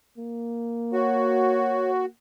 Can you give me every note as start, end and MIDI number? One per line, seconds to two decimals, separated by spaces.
0.18 2.09 58
0.93 2.06 66
0.93 1.91 73